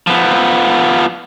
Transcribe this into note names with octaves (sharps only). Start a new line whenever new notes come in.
F3 B3